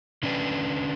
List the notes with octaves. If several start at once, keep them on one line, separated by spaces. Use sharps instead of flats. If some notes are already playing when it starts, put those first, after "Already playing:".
D3 C#4 D4 B4